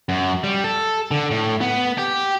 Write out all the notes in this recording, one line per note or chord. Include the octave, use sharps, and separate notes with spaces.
F#2
G3
A4
D3
A2
B3
G4